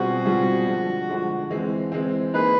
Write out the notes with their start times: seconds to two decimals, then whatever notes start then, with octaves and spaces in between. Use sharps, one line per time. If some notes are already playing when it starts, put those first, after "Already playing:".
Already playing: B2 G3 C4 F4 F#4 G#4
0.25 B2 G3 C4 F4 G#4
0.67 D3 F3 G#3
1.09 D3 F3 G#3
1.50 E3 G#3 C4
1.92 E3 G#3 C4
2.34 A#3 D#4 G#4 B4